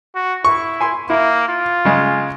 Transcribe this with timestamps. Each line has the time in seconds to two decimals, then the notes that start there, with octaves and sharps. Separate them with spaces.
0.15 F#4
0.45 E4 C#6
0.81 G#5 C6
1.10 A#3 E4
1.48 F4
1.85 C#3 G#3